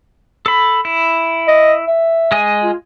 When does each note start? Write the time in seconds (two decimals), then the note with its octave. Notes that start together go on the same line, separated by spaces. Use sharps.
0.46 A4 B5
0.85 E4
1.48 D#5
1.87 E5
2.32 G#3 D#5 G#5
2.63 F4